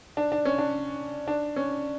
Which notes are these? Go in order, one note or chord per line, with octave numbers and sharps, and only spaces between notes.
D4
D4
C#4
D4
D4
C#4